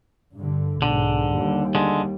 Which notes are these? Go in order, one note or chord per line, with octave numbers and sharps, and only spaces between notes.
G2 D3
B1 G#2 D3
D#2 G3
D3 G#3